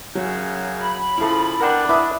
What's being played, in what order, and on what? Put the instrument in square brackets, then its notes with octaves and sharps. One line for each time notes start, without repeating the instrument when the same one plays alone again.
[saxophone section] F#2 C#3 [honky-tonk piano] F#3
[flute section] B5
[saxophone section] C#3 F3 [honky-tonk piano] E4 A4
[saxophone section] B3 D4 [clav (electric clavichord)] A#4 F#5 G5
[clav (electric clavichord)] E4 B4 E5 [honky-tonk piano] D6 D#6